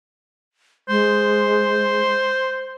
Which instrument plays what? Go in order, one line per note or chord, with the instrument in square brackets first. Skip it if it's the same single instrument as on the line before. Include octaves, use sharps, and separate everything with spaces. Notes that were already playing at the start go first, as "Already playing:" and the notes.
[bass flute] G#3 [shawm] C5